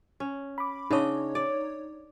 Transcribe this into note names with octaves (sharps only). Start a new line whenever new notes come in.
C#4
B5 D6
C#3 D4 D#4 C#5 D#5
D5